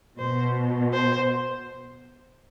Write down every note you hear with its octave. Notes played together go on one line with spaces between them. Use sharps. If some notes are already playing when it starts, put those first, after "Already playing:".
B2 C5
C5